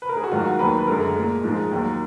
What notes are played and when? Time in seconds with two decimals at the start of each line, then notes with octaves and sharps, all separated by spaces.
0.02 B4
0.09 A#4
0.17 G#4
0.24 F#4
0.31 G#2 D#3 F#3 F4
0.40 F#4
0.50 A#4
0.59 D#2 D#3 F#3 B4
0.78 B4
0.87 F#2 D3 G#3 A#4
1.15 A#2 G#3
1.43 G#2 F3 G#3
1.71 D#2 D#3 F#3